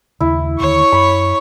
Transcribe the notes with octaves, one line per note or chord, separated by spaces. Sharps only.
D#2 C#3 E4
D#2 D3 D#3 C#5 C#6
F#2 B5